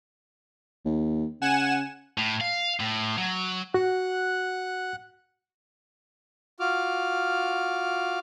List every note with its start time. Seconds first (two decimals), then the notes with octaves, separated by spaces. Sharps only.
0.85 D#2
1.42 C#3 F#5 G#5 E7
2.18 A2
2.41 F5
2.80 A2
3.18 F#3
3.74 F#4 F#5 F#6
6.60 F4 F#4 D6 F6